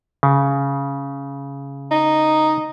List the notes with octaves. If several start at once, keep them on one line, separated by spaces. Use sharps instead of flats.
C#3
D#4